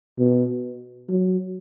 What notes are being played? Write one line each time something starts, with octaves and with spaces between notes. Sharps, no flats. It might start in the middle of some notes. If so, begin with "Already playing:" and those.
B2
F#3